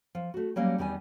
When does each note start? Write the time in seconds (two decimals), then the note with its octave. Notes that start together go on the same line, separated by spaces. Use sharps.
0.15 F3
0.34 A3 F#4
0.56 F#3 G3 A#3 C#4
0.78 E2 D#3 G3 B3 G#5